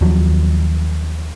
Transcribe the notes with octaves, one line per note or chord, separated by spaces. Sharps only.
D#2 F3 F#3